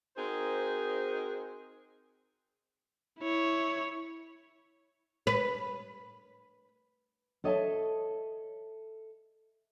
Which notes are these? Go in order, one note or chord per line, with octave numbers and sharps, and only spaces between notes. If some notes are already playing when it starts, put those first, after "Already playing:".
C4 D#4 F#4 G#4 A#4 C5
E4 C#5
B4
A4 C#5 D#5 E5 G#5 A5